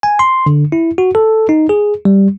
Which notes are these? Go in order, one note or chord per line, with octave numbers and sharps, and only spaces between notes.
G#5
C6
D3
E4
F#4
A4
D#4
G#4
G3